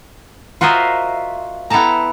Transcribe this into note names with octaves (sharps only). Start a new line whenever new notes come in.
F4 F#4 A#4 C5 D#5 E5
B3 E4 A4 G5 A5 A#5